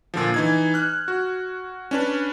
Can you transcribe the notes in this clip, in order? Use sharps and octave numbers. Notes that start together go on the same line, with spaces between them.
A#2 D3 F3
E3 D#4 G#6
F6 F#6
F#4
C#4 D4 B4